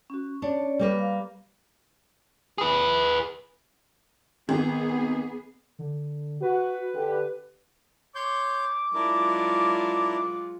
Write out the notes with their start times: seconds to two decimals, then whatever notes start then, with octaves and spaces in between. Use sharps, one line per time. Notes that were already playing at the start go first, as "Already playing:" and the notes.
0.10 C#4 F#4
0.42 C#4 D4 C#5 D5
0.79 G3 A#3 B4
0.99 F5
2.58 G#4 B4
4.49 G#1 B3 G#4
5.79 D3
6.42 F#4 B4
6.95 D3 G4
8.15 C#5 C6 D6 G6
8.94 F#3 G#3 D4 E4 F4 A#4